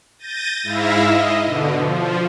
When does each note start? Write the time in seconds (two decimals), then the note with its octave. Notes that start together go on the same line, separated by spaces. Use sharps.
0.19 G6 A6 A#6 D#7
0.63 G#2 E4 E5 F5 A#6
1.06 D#5
1.44 B2 D3
1.75 F3